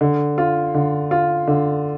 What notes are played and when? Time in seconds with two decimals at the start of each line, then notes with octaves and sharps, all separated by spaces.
0.01 D3
0.38 F4
0.74 D3
1.11 F4
1.47 D3